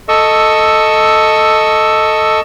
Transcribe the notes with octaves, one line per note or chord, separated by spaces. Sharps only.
A4 D#5 C#6 E6